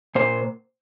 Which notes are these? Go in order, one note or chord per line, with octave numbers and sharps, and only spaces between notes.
A#2 C5